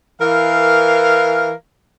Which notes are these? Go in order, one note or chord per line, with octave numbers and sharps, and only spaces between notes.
E3 A#4 F5